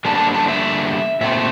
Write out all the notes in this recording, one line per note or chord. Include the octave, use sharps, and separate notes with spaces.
D3 G3 A#3 D4 A5
A5
A5
E5
A#2 A3 C4 E5